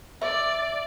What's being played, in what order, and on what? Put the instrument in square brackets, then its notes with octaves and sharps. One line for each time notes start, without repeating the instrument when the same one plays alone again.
[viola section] D5 [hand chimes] E5